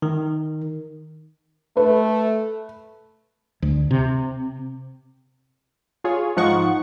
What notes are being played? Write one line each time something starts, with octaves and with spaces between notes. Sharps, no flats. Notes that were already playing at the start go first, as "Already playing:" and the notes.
D#3
A3 B4
D2
C3
F4 G#4 C#5
G#2 F3 D#4 F#5 C#6